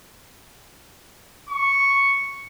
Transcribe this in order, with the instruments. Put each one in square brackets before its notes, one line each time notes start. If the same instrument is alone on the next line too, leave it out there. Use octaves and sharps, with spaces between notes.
[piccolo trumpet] C#6